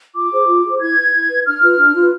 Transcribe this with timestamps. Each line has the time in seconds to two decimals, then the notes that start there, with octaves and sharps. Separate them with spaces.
0.15 F4 D6
0.31 G#4 C5
0.48 F4
0.65 G#4 C5
0.81 E4 G#6
0.97 B4
1.14 E4
1.30 B4
1.46 D4 F6
1.62 F4 B4
1.78 D4
1.94 F4 B4